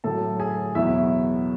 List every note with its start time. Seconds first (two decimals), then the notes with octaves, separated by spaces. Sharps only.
0.04 A2 F#3 A4 A5
0.40 G#4 G#5
0.75 E2 B2 F#3 E4 E5